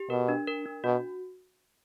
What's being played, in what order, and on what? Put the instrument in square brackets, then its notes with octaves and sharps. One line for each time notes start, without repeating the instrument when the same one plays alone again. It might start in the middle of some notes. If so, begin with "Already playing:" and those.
Already playing: [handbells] G4
[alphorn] B2 [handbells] A#4
[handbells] D4
A#4
D4
[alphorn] B2 [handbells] F#4